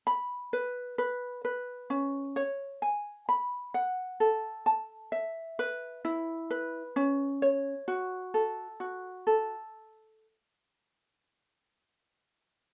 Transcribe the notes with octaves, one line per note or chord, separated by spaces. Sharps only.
B5
B4
B4
B4
C#4
C#5
G#5
B5
F#5
A4
A5
E5
B4
E4
B4
C#4
C#5
F#4
A4
F#4
A4